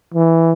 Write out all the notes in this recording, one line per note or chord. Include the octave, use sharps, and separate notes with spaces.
E3